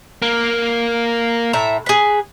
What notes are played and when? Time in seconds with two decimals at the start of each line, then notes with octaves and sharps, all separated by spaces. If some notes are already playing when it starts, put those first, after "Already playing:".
0.22 A#3
1.53 A2 E5 A#5
1.86 G#4 B4